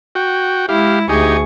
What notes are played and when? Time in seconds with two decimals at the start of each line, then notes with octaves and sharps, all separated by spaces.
0.15 F#4 G5
0.69 G#3 E4 G4 F5
1.09 D2 D#4 G4 G#4 G#5 C#6